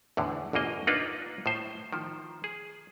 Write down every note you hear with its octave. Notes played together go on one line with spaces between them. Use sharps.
E2 A2 D3
G1 E2 B2 A#3 D#5
A#3 D4 D#4 F4 B4
A2 C5
D#3 F3
G#4